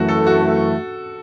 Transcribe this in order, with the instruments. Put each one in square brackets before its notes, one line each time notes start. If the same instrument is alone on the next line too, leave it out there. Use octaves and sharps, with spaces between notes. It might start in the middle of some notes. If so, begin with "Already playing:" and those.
Already playing: [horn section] F#2 E3 A3 [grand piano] F#4
[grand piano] A4
F#4